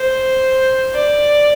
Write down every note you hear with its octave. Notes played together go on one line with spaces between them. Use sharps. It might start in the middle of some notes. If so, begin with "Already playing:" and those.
Already playing: C5
D5